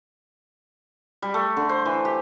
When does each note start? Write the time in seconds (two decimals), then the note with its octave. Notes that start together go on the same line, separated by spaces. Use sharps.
1.22 G3
1.34 A3
1.57 D3
1.69 C5
1.85 E3
2.05 G4